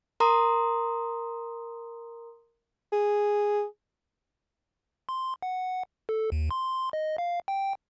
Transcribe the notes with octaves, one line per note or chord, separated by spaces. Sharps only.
A#4 A#5 C6 D#6
G#4
C6
F#5
A4
D#2
C6
D#5
F5
G5